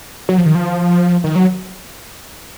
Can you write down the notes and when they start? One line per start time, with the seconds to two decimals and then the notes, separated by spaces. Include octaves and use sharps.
0.29 F#3
0.38 F3
0.46 D#3
0.55 F3
1.24 D#3
1.36 F#3